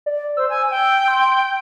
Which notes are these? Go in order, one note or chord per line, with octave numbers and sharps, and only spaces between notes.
D5
C5 E6
G#5
G5
C6